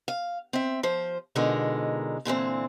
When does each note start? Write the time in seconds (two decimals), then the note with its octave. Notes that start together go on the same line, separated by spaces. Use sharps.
0.08 F5
0.53 C4 E5
0.83 F3 C5
1.35 B2 D3 F3 G#3 D#4 A#4
2.25 A#2 D3 E3 C4